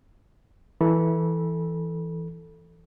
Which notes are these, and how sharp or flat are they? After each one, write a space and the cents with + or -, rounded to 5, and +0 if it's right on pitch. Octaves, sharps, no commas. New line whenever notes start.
E3 +0 A4 +0 B5 -25